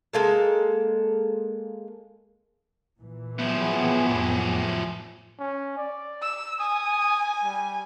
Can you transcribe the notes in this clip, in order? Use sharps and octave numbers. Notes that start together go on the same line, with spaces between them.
G#3 A#3 A4
A#2 E3
F3 F#3 B3 E4 G4 G#4
F2 A2
C#4
D5
E6
G#5 D#6
G3